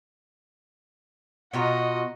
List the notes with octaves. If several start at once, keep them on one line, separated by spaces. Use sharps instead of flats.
B2 F4 F#4 D#5 A#5